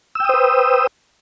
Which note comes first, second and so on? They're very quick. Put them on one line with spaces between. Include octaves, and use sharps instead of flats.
E6 G5 D#6 C5 B4